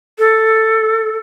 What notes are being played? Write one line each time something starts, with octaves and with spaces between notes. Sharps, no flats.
A4